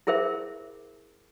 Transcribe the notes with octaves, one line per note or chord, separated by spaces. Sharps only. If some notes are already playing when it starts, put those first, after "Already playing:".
E4 G#4 A#4 C5 E5